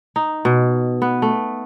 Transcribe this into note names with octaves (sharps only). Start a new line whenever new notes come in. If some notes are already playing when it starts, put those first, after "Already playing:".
D#4
B2
B3
A3